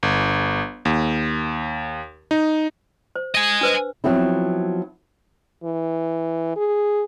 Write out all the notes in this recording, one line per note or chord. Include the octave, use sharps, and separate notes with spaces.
G1
D#2
D#4
C5
D#5 G#5
D4 B4 C5
F3 F#3 B3 C4 E4
E3
G#4